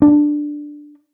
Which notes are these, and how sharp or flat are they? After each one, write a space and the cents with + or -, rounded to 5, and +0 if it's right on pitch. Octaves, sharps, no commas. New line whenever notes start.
D4 +5